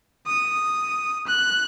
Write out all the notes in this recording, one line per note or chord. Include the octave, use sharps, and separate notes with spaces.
D#6
F#6